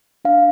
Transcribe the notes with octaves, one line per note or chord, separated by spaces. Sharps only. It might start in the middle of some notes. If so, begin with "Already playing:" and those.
D4 F5